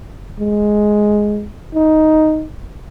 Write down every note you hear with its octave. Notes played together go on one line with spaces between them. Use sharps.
G#3
D#4